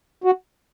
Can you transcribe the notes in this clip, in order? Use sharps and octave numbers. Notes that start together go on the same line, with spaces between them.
F#4